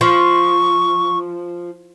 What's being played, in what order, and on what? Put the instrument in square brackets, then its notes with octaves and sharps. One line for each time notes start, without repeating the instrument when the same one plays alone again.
[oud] F3 [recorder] C#6